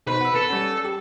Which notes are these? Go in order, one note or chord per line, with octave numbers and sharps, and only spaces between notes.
B2 D#4 B4 C5
F#5 B5 E6
A4
G3 C#4
G4